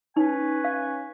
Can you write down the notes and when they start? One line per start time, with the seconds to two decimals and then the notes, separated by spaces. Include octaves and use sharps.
0.17 C#4 D#4 B4 G#5
0.64 F5